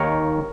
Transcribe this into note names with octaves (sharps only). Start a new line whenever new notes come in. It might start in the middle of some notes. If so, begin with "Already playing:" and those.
Already playing: D#2 D#3 A#3 A#4 C#5